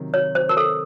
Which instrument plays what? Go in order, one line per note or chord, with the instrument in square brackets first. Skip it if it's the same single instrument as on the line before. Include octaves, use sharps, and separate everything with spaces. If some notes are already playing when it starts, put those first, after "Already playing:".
Already playing: [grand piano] C3 D#3 F#3
[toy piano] C#5
C5
A#4
A4